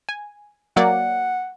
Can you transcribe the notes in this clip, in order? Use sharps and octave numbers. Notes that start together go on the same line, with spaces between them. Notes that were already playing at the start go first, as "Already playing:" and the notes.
G#5
F#3 A#3 D5 F#5